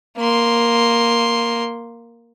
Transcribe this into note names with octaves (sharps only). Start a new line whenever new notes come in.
A#3 C6